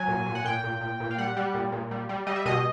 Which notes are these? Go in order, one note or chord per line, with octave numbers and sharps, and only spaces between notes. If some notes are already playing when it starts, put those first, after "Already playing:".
Already playing: F#3 G#5
A#2
A#2
F#5
A#2 G5
A#2
A#2
A#2
F5
G3 F#5
G3
A#2
A#2
G3
G3
G3 D#5
E5
B2 D#5